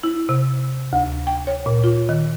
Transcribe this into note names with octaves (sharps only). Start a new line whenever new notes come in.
E4
C3
D2
G5
C#5
A#2
F4
D#3